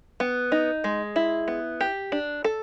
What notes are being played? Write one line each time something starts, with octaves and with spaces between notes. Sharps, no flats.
B3
D#4
G#3
E4
B3
G4
D4
A4